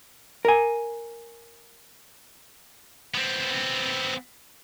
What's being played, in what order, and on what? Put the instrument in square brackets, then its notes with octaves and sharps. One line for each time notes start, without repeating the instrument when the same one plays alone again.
[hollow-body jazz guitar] A#4 G#5
[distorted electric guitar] B3 C4